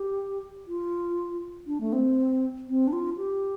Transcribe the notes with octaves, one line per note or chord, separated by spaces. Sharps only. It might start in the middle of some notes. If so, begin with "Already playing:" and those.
Already playing: G4
F4
D4
A3
C4
C4
D4
F4
G4